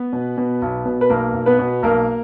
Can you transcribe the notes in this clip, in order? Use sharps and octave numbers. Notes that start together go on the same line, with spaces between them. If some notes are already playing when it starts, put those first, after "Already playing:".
Already playing: B3 B4
B2
B2
B1
B2
B4
B1 A#3 A#4
B1
B3 B4
B2
B1 A#3 A#4